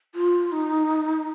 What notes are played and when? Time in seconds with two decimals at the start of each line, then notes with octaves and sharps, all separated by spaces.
0.15 F4
0.52 D#4